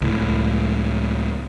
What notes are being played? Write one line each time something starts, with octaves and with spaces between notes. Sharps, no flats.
C#2 A2